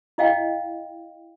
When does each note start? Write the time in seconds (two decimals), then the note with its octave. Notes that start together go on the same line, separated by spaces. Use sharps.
0.18 E4 D#5 F5 G5